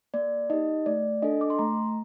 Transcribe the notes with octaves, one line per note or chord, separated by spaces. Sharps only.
A#3 D5
D#4 G4 D#5
A3 D5
D4 A4 D#5
D6
C6
A3 A#5